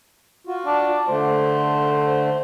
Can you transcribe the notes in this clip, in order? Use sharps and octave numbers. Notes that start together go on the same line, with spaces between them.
F4 F#4
D4
D3 A3 C5